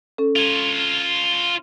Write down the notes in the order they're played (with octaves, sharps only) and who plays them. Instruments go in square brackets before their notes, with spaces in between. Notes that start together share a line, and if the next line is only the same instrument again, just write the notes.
[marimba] C#4 A4
[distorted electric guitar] F4 C#5